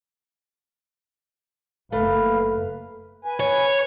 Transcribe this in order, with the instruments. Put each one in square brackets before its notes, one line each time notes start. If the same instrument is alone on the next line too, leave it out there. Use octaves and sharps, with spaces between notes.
[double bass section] F#1 A#3 [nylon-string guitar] A3 [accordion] B4 F5
[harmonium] B4 G#5
[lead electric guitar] C#5